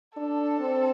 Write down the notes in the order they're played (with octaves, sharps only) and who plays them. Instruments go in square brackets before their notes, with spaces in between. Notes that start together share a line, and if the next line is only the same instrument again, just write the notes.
[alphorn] D4 [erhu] A4
[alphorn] C4